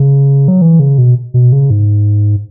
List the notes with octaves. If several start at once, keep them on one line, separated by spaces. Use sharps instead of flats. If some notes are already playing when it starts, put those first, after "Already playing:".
Already playing: C#3
F#3
E3
C#3
B2
B2
C#3
G#2